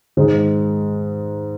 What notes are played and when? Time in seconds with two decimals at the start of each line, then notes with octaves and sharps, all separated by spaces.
0.17 G#2 D#3 G#3 D#4 G#4